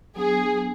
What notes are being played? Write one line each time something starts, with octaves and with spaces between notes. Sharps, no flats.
F#3 B3 D4 G#4